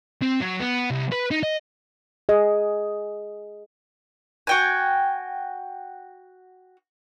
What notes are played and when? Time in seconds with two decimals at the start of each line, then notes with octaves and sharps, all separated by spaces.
0.22 C4
0.41 F#3
0.60 B3
0.91 C2
1.12 B4
1.31 D#4
1.43 D#5
2.29 G#4 D#5
4.47 F#4 G5 G#5